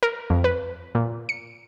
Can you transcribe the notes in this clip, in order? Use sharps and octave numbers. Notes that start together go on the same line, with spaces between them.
A#4
F2
B4
A#2
C#7